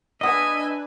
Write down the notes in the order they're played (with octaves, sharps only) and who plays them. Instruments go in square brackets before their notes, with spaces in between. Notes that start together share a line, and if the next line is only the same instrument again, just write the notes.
[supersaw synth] D4 B4 [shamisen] G#4 F#5 [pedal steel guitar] D#5 [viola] E5 G#5